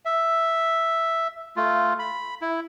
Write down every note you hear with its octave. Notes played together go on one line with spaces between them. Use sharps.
E5
A3 F4
B5
E4